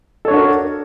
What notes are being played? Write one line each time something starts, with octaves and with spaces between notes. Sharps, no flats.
D4 F#4 A4 A#4 C#5